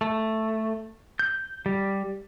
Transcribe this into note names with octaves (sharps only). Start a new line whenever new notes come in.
A3
G6
G3